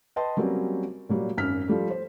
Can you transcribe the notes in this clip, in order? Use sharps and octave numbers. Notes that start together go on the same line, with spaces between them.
B4 D#5 G5 A5 C6
F#3 G3 A#3 C4 C#4
A#2 F#3 G3
G#1 F#2 F6 B6
F3 G3 A3
C5